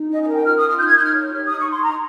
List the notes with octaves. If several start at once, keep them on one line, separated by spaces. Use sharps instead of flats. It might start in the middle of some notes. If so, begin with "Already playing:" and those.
Already playing: D#4
C#4 D#5
D#5
A#4
G5
F4 F6
D#6
F4
F6
D#4 G6
G#6
D#4 G6
F6
C#5
G4
D#4 D#6
C#6
D#4 C6
D#4 A#5